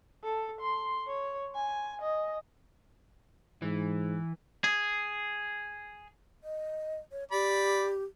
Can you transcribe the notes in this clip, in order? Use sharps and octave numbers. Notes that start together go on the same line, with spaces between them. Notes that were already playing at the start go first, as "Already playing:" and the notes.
A4
C6
C#5
G#5
D#5
G#2 E3
G#4
D#5
C#5
G4 D5 B5